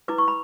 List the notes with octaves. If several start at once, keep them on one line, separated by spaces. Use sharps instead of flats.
E4 B4 D6
C#6
B5